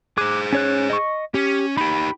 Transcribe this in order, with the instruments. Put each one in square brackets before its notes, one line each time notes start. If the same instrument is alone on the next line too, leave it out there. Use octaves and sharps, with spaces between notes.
[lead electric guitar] G#4 C5 [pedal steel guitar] D6 F#6
[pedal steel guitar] C#4 C#5 F#6
D#5 C#6
[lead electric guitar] C#4 [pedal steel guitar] G4
[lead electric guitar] D#4 G4 [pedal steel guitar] B5